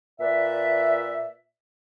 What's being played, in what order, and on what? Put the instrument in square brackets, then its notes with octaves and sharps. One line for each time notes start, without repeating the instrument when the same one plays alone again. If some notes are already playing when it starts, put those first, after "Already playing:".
[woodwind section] A#2 B4 D5 E5